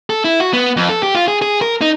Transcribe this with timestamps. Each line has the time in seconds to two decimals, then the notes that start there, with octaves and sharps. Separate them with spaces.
0.10 A4
0.24 E4
0.40 F#4
0.53 B3
0.77 F2
0.90 A4
1.03 G4
1.15 F4
1.28 G#4
1.42 G#4
1.62 A#4
1.81 D#4